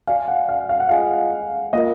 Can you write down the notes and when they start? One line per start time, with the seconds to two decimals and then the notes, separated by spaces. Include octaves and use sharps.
0.07 F#4 D5 F5 G#5
0.28 F#5
0.49 F5
0.69 F5
0.80 F#5
0.89 F4 G#4 D#5 F5 G#5
1.73 A#3 F4 A#4 D#5